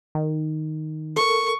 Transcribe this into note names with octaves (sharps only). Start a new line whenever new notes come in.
D#3
A4 A#4 C#6